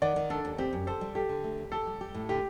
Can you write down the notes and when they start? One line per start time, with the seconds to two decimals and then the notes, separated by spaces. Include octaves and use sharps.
0.02 D#3 D5 F#5
0.16 D#3
0.30 D4 A4
0.45 D#2
0.58 C4 G4
0.73 F#2
0.87 A4 C5
1.01 G3
1.15 G4 A4
1.29 D3
1.44 A3
1.58 D#2
1.72 G4 A4
1.87 G3
2.01 G4
2.14 A2
2.29 D3 G4